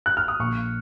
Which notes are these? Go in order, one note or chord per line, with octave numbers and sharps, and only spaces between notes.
F#6
F6
D#6
A#1 C#6